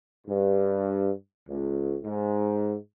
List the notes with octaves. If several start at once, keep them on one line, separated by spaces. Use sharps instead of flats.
G2
C#2
G#2